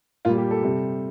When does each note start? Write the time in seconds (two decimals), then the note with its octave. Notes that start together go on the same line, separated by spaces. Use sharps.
0.25 A#2 G3 F4
0.38 G4
0.51 A4
0.63 C3 G3